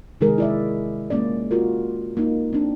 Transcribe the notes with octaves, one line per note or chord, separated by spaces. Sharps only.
C3 D#3 G#3 G#4 A#4
E4 D5 E5
G#3 A#3 C#4 D5
F4 F#4 A#4
A#3 D#4
C4 D4